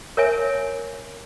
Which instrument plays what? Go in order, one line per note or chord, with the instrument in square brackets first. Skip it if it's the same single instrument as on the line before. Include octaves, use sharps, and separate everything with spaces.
[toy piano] A#4 C#5 E5 G#5